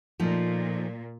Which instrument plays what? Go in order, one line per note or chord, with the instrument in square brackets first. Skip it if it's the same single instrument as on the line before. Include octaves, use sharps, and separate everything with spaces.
[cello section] A#2 [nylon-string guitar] F3 A3 D#4